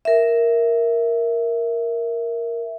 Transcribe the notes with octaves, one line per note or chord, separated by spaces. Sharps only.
A#4 E5